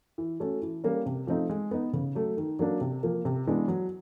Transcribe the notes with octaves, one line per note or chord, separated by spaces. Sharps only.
E3
A3 C#4 F#4 A4
E3
G3 A#3 C#4
C3
F3 A3 C4 D#4
G#3
B3 D#4
C#3
F#3 A3
D#3
F#3 A#3 D4
C3
F3 A#3
C3
E3 G#3 B3 D4
F#3